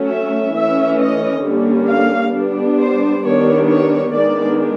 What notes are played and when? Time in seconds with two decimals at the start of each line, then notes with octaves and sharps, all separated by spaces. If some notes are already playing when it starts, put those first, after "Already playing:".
Already playing: F#3 A3 C#4
0.10 E5
0.54 E3 A3 C#4 E5
0.99 D#5
1.43 D3 G3 A#3 C#4
1.89 F5
2.33 G3 B3 D4
2.78 C5
3.22 D#3 G3 B3 D4 C#5
3.67 C#5
4.12 D#3 G#3 B3 D4 D5